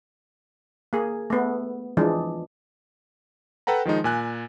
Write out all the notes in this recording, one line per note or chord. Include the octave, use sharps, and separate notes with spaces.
A#3 G#4
A3 B3
E3 F3 G#3 D4
A4 B4 F#5 G5 A#5
D#3 F3 G#3 D#4
A#2 G#5 F#6